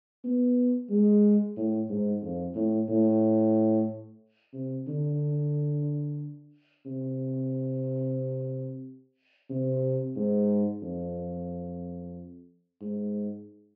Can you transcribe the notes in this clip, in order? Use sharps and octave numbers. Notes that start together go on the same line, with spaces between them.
B3
G#3
A2
G#2
F2
A2
A2
C3
D3
C3
C3
G#2
F2
G#2